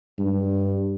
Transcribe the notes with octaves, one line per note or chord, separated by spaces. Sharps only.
G2